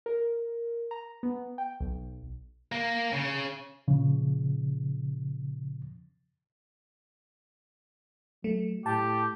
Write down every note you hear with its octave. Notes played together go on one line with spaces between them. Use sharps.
A#4
A#5
B3
G5
B1
A#3
C#3
A#2 C#3 F3
F#3 A3
A2 G4 A5